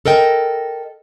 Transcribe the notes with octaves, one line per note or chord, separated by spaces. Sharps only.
A4 A#4 D#5 G5